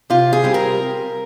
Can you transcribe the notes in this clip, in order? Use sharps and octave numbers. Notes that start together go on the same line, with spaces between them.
C3 F4
G#4
G3 C4
A#4